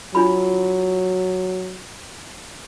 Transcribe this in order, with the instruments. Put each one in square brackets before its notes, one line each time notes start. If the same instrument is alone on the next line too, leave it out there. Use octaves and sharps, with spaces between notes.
[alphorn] F#3 [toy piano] D4 F4 B5